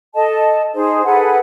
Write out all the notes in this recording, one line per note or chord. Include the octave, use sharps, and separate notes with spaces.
A4 D#5 A5
D#4 G#4 C5
G#4 A4 B4 F#5